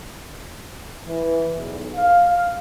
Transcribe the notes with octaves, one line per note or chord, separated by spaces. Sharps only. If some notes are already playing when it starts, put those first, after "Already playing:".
E3
B1 E2
F5